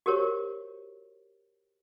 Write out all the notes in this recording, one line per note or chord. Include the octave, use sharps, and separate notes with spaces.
F#4 G4 A#4 C5 C#5